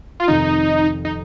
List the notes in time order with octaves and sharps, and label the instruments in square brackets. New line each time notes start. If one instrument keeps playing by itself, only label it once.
[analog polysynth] F4
[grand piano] F2 C3 D#3 [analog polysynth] D#4
[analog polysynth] D#4